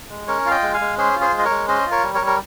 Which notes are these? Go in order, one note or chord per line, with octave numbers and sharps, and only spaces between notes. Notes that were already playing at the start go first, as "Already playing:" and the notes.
G#3
C#4 A#4 C#5
F4 F5
D#5 G5
G#3
F5 G#5
G#3
C#4 G#4 C5
F4
G#4 C5
G#3
D#5
A#4 C#5
G#3
C#4 C5 D#5
F4
A#4 C#5
G3
A#4 C#5
G3
A#4